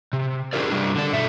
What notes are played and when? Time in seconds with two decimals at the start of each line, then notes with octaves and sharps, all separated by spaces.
0.13 C3
0.53 D4 F4 G4 G#4 A#4 D5
0.70 C3 G3 D4
0.95 D3 D4
1.13 B2 A4 E5